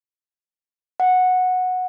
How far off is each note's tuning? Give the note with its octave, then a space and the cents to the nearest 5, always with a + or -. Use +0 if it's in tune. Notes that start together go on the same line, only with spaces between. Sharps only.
F#5 -10